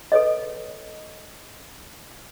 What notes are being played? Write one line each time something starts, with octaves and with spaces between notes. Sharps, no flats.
A4 B4 C#5 D#5